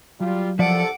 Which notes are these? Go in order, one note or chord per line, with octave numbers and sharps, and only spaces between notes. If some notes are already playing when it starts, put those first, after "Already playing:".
F#3 G3 F4
C2 C3 F3 A4 D5 F#5 D6